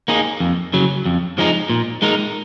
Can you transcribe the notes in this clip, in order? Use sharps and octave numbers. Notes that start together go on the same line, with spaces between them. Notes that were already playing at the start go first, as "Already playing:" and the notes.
A#3 D#4 G#4
F2
C#3 F#3
F2
F3 G#3 D#4
A#2
G#3 D#4 A#4